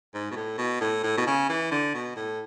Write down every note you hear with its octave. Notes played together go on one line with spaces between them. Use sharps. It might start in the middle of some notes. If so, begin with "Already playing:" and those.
G#2
B2
A2
B2
A2
A2
B2
C#3
E3
D3
B2
A2